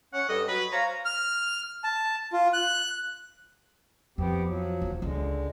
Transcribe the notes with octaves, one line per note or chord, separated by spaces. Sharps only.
C#4 F#5
G2 A4 D#5
F#3 B4
C5 C#5 F5 A#5
F6
A5
F4
F#6
F2 B3 C4 G4
F3 F#3
D#1 D#3
C#2 D3 G#3